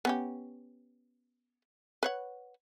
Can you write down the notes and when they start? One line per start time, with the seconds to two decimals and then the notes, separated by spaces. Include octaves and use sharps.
0.05 B3 C#4 G4
2.03 B4 C#5 F#5